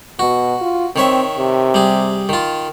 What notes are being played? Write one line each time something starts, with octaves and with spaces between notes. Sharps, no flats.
B2 F#4
F4
D#3 C4 C#5 E5
C3
G3 G#4
D#3 F4